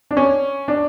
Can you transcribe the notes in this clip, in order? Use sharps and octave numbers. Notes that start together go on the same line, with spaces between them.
D4
C#4
D4